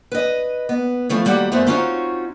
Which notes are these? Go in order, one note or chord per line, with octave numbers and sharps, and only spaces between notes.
B4 D#5
B3
E3 F3 A3 C#5
D#2 G3 F#4 G4 F#5
F#2 A3 B3 G#4 C5 E5
C4 C#4 D#4 F4 F#4 C#5